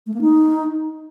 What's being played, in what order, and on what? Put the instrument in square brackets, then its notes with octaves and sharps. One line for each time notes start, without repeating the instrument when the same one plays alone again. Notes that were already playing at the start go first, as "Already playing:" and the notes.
[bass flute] A3
A#3
D#4